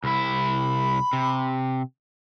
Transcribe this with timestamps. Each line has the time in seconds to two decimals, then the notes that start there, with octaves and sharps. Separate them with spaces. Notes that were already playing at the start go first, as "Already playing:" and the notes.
0.04 C2 E4 B5
1.13 C3